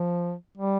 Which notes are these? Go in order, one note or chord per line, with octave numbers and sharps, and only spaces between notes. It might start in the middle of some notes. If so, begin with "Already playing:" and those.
Already playing: F3
G3